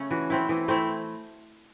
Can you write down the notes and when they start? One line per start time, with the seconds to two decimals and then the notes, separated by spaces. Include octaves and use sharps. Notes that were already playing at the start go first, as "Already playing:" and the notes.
Already playing: C#3 A3 C#4
0.10 E3 F#4
0.30 A3 C4 E4
0.49 E3
0.68 A3 C4 E4